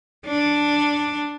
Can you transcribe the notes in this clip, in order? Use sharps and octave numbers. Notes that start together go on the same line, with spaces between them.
D4